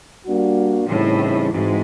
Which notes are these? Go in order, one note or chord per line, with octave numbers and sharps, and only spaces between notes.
G3 A#3 D4 F#4
A2 C#3 E3 G3 C4 D#4
G#2 E3 G#3 C4 D#4 F#4